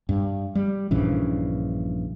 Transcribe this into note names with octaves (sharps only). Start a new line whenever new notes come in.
G2
G3
A#1 G2 C#3 E3